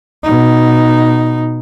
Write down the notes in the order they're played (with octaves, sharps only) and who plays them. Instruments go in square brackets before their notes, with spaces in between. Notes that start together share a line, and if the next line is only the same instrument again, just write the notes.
[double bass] B2 D#4